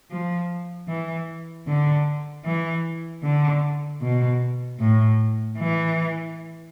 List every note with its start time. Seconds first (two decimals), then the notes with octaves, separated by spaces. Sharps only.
0.11 F3
0.88 E3
1.67 D3
2.45 E3
3.23 D3
4.02 B2
4.79 A2
5.58 E3